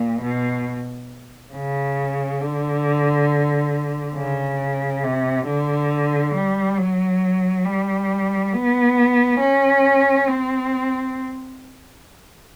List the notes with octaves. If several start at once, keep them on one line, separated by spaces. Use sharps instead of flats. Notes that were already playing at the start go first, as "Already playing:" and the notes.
Already playing: A#2
B2
C#3
D3
C#3
C3
D3
G3
F#3
G3
B3
C#4
C4